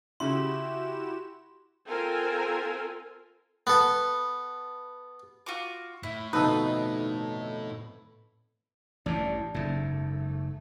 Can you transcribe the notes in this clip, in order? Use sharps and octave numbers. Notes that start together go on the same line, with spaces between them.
C#3 E4 F#4 G4 C6 E7
C4 F4 A4 A#4 G#5
B3 A4
F4 F#4 D6
A2 E4
F2 B2 D3 D#4 A4 B4
A1 G2 E3 D4
F#1 G#2 A3